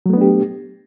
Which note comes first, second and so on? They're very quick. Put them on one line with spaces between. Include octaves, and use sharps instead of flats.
F#3 A3 B3 D4 G4